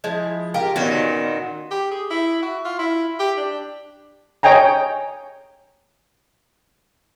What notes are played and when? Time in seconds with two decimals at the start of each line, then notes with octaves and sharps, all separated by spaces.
0.04 F3 G#3 E4
0.54 F4 G4 A#4
0.76 A#2 D#3 B3 C#4 F#4
1.71 G4
1.91 G#4
2.10 E4
2.42 F#4
2.65 F4
2.79 E4
3.19 G4
3.37 D4
4.43 C#5 D#5 G5 G#5 A#5